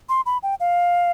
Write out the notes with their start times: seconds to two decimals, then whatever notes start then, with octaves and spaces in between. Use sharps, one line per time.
0.09 C6
0.26 B5
0.43 G5
0.60 F5